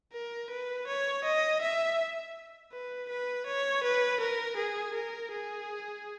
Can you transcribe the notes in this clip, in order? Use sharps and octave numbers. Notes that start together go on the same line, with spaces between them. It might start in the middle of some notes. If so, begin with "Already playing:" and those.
A#4
B4
C#5
D#5
E5
B4
B4
C#5
B4
A#4
G#4
A#4
G#4